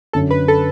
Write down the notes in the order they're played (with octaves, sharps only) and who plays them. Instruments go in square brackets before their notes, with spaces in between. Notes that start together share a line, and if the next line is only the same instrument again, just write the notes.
[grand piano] F#2 D3 F#3 C#4 [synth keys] A4
[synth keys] B4
A4